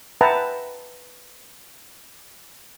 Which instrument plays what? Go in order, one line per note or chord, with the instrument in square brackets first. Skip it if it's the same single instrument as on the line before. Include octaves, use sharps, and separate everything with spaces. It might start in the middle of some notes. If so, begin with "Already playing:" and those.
[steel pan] B4 E5 F#5 G5 A5 A#5